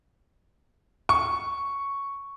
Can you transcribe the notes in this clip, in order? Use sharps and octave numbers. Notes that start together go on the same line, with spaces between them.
C#6